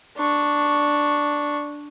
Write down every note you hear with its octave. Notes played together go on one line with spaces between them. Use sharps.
D4 C#6